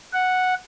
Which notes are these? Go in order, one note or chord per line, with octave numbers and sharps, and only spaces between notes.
F#5